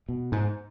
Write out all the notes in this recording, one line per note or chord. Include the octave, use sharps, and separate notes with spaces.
B2
G#2